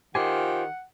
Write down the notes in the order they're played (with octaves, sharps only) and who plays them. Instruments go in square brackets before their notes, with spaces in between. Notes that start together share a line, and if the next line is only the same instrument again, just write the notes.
[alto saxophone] D#3 [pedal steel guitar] F4 C5 G#5 [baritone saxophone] G4 [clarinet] F#5